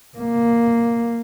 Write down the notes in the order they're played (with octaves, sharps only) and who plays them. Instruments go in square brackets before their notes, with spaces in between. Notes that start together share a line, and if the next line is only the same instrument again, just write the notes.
[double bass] A#3